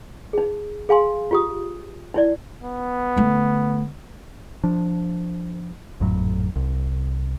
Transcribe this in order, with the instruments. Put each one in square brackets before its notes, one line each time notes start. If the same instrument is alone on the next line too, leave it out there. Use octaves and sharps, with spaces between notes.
[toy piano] D#4 G#4
G#4 F5 G#5 C6
F4 G4 D#6
D#4 E4 D5
[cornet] B3
[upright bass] D3 A3
[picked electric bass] F3 D4
G#1 F2 A2 F#3
C2